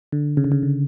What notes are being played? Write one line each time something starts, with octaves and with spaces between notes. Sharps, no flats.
D3
C#3
D3
C#3
D3